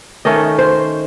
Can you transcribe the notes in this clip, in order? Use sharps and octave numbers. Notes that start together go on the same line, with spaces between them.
D#3 A3 C#4 D#5
C5